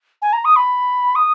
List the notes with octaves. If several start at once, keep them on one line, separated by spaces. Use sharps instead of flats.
G#5
A#5
D#6
B5
D#6